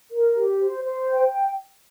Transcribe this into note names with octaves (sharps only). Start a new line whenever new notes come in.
A#4
G4
C5
C5
G5